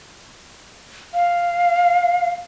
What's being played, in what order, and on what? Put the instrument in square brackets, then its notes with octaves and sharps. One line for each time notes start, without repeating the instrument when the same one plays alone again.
[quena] F5